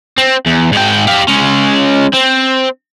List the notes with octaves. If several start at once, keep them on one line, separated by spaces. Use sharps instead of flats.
C4
E2
G#2 G5
G4 F5
G#3 C#4
C4